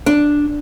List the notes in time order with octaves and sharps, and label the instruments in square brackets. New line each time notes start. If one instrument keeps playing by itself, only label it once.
[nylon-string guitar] D4